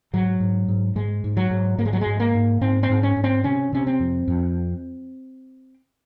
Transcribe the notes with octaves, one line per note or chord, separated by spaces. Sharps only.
G#2 F#3
G#2
G#2
G#2 G#3
G#2
F#3
G#2
G#2 A#3
G#3
F#3
G#3
G#2
A#3
G#2
G#2 C4
C4
G#2
C#4
G#2
C4
C3 C#4
C3 C#4
C4
F2
F2